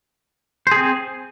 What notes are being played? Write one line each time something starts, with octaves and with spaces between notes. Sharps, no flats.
C4 G#4 C5